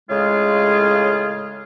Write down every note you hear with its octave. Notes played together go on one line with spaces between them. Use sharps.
A2 C#3 G#3 F4 G#4